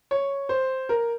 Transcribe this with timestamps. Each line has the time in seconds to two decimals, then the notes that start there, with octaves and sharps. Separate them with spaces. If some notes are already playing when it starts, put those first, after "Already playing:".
0.11 C#5
0.49 C5
0.89 A#4